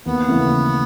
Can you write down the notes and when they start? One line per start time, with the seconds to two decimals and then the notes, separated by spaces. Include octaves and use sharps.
0.06 D#2 B3
0.28 C#3 E3 A3